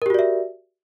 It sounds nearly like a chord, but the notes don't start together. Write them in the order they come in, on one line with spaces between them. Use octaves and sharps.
A#4 G4 F#4 D5 E5